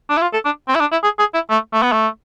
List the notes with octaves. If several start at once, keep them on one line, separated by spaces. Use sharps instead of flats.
D4
E4
F4
A4
D4
C4
E4
D4
E4
G#4
G#4
E4
A3
A3
B3
A3